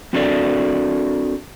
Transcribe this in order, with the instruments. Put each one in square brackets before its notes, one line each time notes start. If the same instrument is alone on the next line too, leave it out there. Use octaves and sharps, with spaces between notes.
[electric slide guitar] C4 D4 F#4 A4 A#4 D5